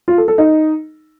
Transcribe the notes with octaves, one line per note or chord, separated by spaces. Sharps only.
F4
A4
A4
D#4